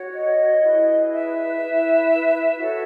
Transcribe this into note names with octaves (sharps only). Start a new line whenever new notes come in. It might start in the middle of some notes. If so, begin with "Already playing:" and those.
Already playing: F#4 C#5
D#5
E4 G#4 B4
E5
E4 B4
F#4 A4 C#5